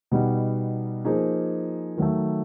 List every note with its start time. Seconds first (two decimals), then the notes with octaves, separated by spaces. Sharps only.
0.11 B2 G3 B3 D#4
1.05 F3 A#3 D#4 G#4
1.97 D#3 F#3 A3